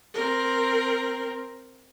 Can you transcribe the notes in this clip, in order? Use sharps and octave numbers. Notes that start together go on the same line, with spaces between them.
C4 A#4